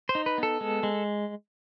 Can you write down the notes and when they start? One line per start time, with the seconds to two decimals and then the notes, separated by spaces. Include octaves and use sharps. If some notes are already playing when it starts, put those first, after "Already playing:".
0.09 C5
0.15 D#4
0.26 B4
0.38 B3 A4
0.61 G#3
0.83 G#3